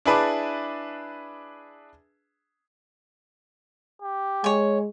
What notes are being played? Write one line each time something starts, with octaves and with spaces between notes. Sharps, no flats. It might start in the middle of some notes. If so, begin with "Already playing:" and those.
D4 E4 G#4 B4 A5 D6
G4
G#3 C#5 G#5